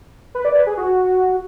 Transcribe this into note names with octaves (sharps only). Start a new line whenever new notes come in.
B4
D5
B4
G#4
F#4